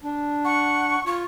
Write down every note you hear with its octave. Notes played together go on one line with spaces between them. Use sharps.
D4
F#5 C#6
F4 C#6